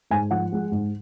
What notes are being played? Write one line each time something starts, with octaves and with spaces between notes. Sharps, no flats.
G#2 G#5
F3 F#5
G#3
G#2